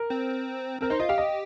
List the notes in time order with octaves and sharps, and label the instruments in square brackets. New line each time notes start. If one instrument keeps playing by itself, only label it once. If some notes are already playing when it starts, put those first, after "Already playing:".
Already playing: [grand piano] A#4
[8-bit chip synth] C4
[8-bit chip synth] C4 [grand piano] A#4
[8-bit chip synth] D#4 [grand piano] C5
[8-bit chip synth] F4 [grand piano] D#5
[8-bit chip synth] G4 [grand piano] F5
[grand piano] D#5